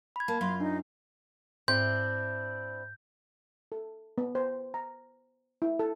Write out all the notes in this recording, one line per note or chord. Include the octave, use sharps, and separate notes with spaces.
B5 G#6
A#3 A5
F#2 F4 F5 C6
D4 D#4
G#2 C4 D4 E4 G6
A4
B3
C5
A#5
E4
A4